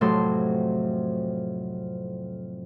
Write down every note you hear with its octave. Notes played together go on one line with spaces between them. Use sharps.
F2 A2 C3 F#3 A4 C6